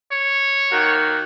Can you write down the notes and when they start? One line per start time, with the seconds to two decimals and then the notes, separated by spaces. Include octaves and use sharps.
0.12 C#5
0.72 D#3 A#3 F#4